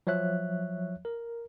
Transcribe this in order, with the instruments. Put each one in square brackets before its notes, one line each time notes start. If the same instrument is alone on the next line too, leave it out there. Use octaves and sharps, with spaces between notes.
[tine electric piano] F3 F#3 C#5 E5 F#6
A#4